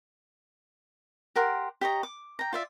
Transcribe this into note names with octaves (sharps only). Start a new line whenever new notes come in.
G4 A#4 F#5 C6
G4 C#5 D#5 A#5
D6
G5 A#5
F4 D5 E5